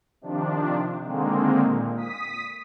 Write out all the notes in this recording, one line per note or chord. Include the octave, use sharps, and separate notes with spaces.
C3 D#3 F3 D4
D3 D#3 G#3 A#3 C4
A#2
D#6 B6